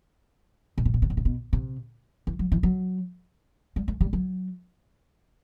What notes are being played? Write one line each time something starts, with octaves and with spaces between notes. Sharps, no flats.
B2
C3
B2
C3
B2
C3
B2
C3
E3
F#3
E3
F#3
G3
A3
G3
F#3